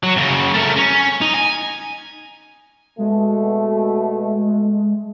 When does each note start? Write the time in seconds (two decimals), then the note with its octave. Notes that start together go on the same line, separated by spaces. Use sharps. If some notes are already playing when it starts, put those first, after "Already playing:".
0.03 F#3
0.16 F#2 C#3
0.54 A3 A#4
0.77 C#4
1.21 D#4
1.34 G#5
2.99 B2 G#3 A3